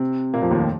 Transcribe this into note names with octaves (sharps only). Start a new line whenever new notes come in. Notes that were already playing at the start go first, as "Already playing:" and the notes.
Already playing: C3 C4
A#2 A#3
F2 F3
D#2 D#3
F3